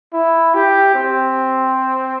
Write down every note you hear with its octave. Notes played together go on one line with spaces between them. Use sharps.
E4
G4
C4